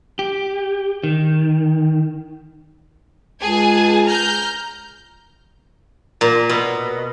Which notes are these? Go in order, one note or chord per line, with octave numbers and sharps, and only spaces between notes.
G4
D#3
C#2 G#4 G#5 A5
A#5 F6 G6
A#2
B2